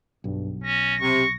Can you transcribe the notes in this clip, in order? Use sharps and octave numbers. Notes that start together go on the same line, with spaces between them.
B1 G2
C#4 A#6
C3 C#6